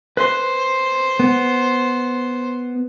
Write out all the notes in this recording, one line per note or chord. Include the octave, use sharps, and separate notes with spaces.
B4 C5 C6
B3